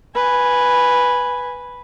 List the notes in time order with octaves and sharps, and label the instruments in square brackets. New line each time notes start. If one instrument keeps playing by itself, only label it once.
[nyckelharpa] B4 G#5